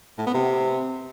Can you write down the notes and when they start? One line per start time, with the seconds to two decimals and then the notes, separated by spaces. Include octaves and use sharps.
0.18 A2
0.26 B3
0.35 C3